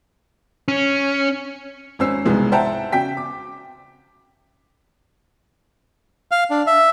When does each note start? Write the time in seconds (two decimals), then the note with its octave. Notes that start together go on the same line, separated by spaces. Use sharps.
0.68 C#4
1.99 G#1 C#4 C5 E6 C7
2.26 E1 C2 G#2 G#3 B3
2.52 C5 E5 F#5 G5 A5 A#5
2.92 C#3 F#4 G5 B6
3.17 D6
6.31 F5
6.50 D4
6.67 E5